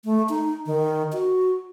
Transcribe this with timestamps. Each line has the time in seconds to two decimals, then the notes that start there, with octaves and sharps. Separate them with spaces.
0.05 A3
0.29 D#4
0.66 D#3
1.12 F#4